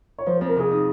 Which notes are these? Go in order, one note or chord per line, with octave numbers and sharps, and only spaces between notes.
C#5
F3 C5
C5
F2
A#4
C3 G#4
D#4